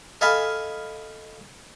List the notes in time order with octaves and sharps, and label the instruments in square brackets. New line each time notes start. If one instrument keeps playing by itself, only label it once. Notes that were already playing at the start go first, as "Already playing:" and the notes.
[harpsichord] A4 D#5 F5 G#5 A5 B5